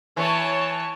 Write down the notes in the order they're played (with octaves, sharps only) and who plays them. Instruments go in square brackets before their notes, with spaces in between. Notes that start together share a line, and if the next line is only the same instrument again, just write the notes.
[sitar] E3 [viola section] C#5 A5